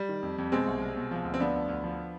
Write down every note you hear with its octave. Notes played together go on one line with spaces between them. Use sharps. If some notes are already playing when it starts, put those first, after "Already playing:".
Already playing: G3
D#3
F2
F2
B2 G#3 C4
C2
C2
B2
F3
D2
C4
F3 B3 D4
D2
D2
F3